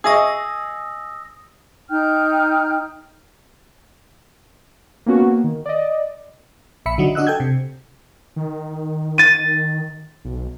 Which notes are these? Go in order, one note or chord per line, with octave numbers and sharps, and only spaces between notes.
G#4 D#5 C#6 D#6 E6 A#6
D#4 G5 F6 G6
A#3 B3 C#4 F#4
A#3
D#3
D5 D#5
A#1 E5 B5 C#7
D3 F#3 D#4
D4 F#4 D#5 E6 F#6
A4 G5 G6 G#6
C3
D#3
A6 D#7
B1